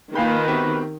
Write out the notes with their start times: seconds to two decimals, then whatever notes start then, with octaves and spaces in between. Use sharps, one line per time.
0.15 D#3 A#3 F4 B4 F5 G5 G#5 B5
0.48 B3 C4 F#4 G4 E5